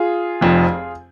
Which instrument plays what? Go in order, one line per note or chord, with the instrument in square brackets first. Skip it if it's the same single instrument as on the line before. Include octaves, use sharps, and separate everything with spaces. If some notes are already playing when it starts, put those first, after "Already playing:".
Already playing: [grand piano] F4 G#4
F1 F2 F3